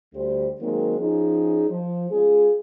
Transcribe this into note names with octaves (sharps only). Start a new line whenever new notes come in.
D2 D3 G3 G4 C5
D#3 F#3 G#3 A#3 C4
F3 C#4 D#4 G#4
F3
G#3 C#4 F4 G#4